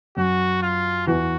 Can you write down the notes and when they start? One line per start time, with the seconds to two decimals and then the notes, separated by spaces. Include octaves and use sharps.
0.17 F#2 F#3 F#4
0.62 F4
1.07 E2 E3 F#4